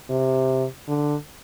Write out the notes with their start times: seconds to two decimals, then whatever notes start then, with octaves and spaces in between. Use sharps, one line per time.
0.09 C3
0.88 D3